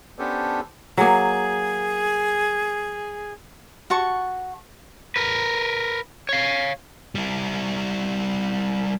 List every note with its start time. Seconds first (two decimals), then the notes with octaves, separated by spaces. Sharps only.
0.19 B3 C#4 D4 G4 A4 C5
0.97 F#3 A#3 G#4
3.90 F#4 A5 C#6
5.16 A#4 B4
6.29 C#5 F5
7.15 G3 E4